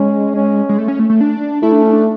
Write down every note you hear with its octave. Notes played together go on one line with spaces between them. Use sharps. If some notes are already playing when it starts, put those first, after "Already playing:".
Already playing: G#3 C#4
C#4
G#3
A3
C#4
A3
A3
D4
A3 E4
D4
C#4
D4